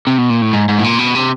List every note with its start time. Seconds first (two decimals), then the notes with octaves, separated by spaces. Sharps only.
0.07 C3
0.18 B2
0.30 A#2
0.42 A2
0.53 G#2
0.69 G#2
0.79 A2
0.84 A#2
0.99 B2
1.15 C3